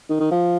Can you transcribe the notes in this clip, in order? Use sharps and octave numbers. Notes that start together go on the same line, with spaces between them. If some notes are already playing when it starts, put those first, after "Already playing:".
D#3
D#3
F3